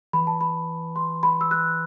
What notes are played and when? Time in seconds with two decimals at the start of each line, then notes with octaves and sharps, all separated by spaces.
0.13 E3 B5
0.27 A5
0.41 B5
0.96 C6
1.23 B5
1.41 E6
1.51 F#6